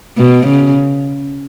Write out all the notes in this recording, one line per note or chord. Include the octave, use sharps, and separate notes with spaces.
B2
C#3